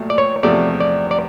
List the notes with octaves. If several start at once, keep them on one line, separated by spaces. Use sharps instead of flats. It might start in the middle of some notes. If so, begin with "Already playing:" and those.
Already playing: A#1 A#2 F#3 A3
D5
C#5
E2 C3 F3 A3 D5
D5
D5